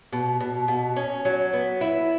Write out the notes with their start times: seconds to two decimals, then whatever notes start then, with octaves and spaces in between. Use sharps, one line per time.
0.12 B2
0.40 B2
0.68 B2
0.96 C#4
1.25 F#3
1.53 B3
1.81 E4